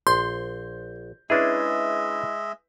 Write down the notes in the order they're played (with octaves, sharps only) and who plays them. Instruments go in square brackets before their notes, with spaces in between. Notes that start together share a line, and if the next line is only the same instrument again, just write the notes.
[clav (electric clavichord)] A#1 [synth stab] C6 [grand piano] G6
[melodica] G#3 D#5 E5 [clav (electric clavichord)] C#4 D4 G#4 [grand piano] E4 B4